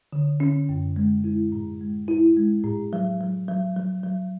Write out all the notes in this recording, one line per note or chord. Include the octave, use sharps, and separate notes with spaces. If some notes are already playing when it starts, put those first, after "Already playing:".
D3
D3 C#4
F#2
G#3
G#3 E4
A2
G#3
A2 E4
G#3
A2
F#3
F#3
F#3
F#3
F#3